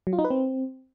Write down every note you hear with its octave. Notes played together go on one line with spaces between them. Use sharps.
F#3
F4
D#4
B4
C4